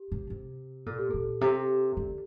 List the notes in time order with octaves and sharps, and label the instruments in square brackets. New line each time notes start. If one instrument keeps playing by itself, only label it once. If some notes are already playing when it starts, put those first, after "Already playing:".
Already playing: [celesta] G4
[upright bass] C3
C3
[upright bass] A#2 [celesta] A4
[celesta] G4
[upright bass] A#2 [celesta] A4
[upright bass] C3 [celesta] G4
[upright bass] D3